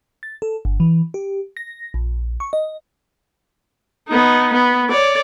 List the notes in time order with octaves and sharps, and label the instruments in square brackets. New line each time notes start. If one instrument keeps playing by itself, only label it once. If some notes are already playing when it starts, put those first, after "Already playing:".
[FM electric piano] A6
A4
G1
E3
G4
A#6
A#1
C#6
D#5
[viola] B3 D#4
B3
C#5 D5